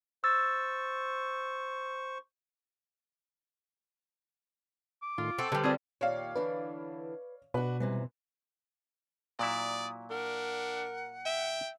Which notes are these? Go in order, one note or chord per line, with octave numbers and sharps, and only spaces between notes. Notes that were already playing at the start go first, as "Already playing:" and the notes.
C5 C#6 E6 A6
D6
A2 D#3 F4 C6
C4 A4 F#5 C6 C#6
D3 G3 G4 A4 B4 C5
C4 F4 G#4 D5
D#2 A#2 G4 C#5 D5 F5
D3 E3 D4 B4
B2 D4 F#4 B4
G#2 C3 E3 G3
A#2 F#3 E4 D5 D#6
D4 A#4 F#5
E5 G5